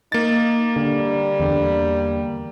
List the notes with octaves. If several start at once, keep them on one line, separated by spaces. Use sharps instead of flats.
A#3 D#4 A6
D3 G3
E2 D3